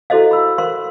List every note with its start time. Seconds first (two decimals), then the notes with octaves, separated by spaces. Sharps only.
0.10 E4 F#4 A4 C5 D#5 F5
0.31 B5 E6
0.58 A#4 C5 F5 C6